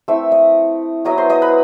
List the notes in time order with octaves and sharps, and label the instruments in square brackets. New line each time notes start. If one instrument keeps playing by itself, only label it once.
[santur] A3 C4 E4 E5 E6
D#5 D#6
F#3 B3 E4 D#5 D#6
C5 C6
D#5 D#6
B4 B5